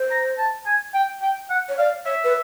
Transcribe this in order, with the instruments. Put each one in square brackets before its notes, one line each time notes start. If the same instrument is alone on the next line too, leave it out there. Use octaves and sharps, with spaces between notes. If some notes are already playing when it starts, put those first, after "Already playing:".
Already playing: [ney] C5
[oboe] A#5
A5
G#5
G5
G5
F#5
[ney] C#5
[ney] D5 [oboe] F5
[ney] C#5 [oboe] E5
[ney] B4